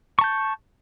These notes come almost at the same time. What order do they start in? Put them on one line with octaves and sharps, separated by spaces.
C#6 A5 G6